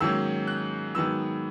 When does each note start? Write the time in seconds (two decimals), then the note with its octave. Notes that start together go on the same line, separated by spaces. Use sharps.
0.01 G#2 D#3 F#3 A#3 C#4 E6
0.47 F#6
0.94 G#2 D#3 F#3 B3 E6